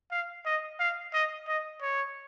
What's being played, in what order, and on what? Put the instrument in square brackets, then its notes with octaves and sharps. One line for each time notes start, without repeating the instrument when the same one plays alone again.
[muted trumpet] F5
D#5
F5
D#5
D#5
C#5